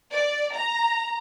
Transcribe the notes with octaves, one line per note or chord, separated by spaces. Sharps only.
D5
A#5